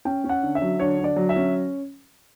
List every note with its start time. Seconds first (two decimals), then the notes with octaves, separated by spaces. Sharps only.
0.05 C#4 G5
0.24 C#4
0.29 F#5
0.43 D3
0.55 E5
0.62 F#3
0.80 D3 C#5
0.99 D3
1.04 D5
1.16 F#3
1.29 E5
1.36 C#4